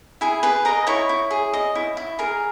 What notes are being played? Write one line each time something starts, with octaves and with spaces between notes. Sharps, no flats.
E4 G#4 G#5
G#4 B4 B5
A#4 D#5 A#5
E4 C#5 C#6
E4
G#4
D#5
E4
E4
G#4 A#4 A#5